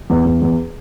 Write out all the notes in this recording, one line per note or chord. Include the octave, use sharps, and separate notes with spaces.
E2
E2
E2